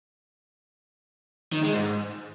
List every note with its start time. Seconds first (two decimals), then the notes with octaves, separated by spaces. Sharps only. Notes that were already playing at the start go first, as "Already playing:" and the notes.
1.52 D#3
1.63 G#3
1.74 G#2